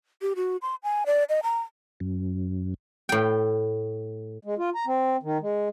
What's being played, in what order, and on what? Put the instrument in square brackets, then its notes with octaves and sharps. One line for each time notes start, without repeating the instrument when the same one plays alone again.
[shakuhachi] G4
F#4
C6
G#5
D5
D#5
A#5
[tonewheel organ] F#2
[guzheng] A2 G5
[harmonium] G#3
F4
A#5
C4
D#3
G#3